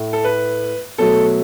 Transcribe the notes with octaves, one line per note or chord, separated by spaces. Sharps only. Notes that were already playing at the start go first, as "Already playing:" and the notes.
Already playing: A2 A3
A4
B4
B2 F#3 A3 A4